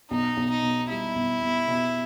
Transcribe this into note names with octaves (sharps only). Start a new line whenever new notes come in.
B1 D#4
B1
D#4
B2
G3 E4
B1
B1
B2